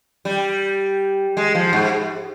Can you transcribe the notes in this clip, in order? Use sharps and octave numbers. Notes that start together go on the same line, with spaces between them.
G3
G#3
F3
G#2